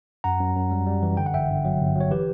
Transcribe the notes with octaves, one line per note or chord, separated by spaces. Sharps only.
F#2 F#5 A#5
F#2
F#2
G3
G3
E3
D3 G5
F#5
G1 E5 G5
G1
F#3
G1
F#3 C#5
E3 G4 B4